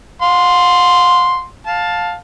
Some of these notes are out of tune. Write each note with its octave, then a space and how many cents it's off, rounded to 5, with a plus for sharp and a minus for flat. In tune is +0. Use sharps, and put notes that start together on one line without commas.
F5 +45 C6 +0
F5 +15 A5 +0